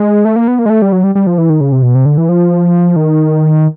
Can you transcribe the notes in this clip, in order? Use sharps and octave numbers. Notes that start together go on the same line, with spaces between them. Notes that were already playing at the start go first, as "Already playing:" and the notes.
Already playing: G#3
A3
A#3
B3
A#3
G#3
A3
G3
F#3
G3
G3
F3
E3
D#3
C#3
C3
B2
C3
D3
E3
F3
D#3